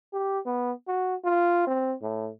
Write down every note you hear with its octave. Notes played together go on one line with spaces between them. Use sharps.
G4
B3
F#4
F4
C4
A2